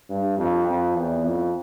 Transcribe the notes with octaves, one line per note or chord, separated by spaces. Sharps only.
G2
F2
F2
E2
F2